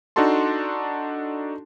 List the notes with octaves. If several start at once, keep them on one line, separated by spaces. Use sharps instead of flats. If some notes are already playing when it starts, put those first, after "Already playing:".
D4 D#4 F#4 A4 A5 C6